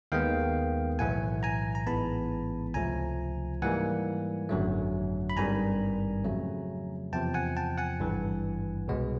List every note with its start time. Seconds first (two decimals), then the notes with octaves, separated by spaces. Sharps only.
0.12 D#2 D#3 G#3 B3 F5 G5
0.99 B1 A2 E3 A3 F#5 G#5
1.43 G#5 A#5
1.75 A#5
1.87 A1 G#2 E3 G#3 B3 A5 B5
2.74 C#2 C3 F3 A3 G#5 A#5
3.62 G#2 E3 G3 A#3 F#5 G#5
4.49 G#1 F#2 D3 F#3 A3
5.30 B5
5.37 G#1 G2 D#3 G3 G#5 A#5
6.25 F2 C#3 F#3 A3
7.13 E2 C3 F3 G5 A5
7.34 F#5 G#5
7.57 G5 A5
7.78 F#5 G#5
8.00 G#1 G2 E3
8.88 C2 B2 G#3 B3